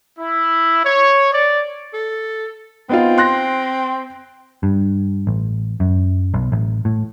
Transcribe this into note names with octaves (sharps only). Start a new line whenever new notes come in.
E4
C#5
D5
A4
B3 C4 D#4 F4
C6 F#6 A#6
G2
A1
F#2
B1
A1
A2